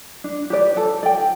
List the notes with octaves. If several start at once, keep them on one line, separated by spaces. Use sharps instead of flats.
D4
G4 B4 D5
A4
D5 G5